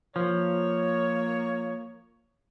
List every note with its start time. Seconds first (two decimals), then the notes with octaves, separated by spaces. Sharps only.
0.16 F3 A#3 C#5